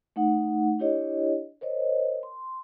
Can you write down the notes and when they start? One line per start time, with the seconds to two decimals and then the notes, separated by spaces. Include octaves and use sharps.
0.16 A3 D#4 F#5
0.79 D4 E4 G4 C#5 D#5
1.61 A#4 C5 C#5 D#5
2.23 C6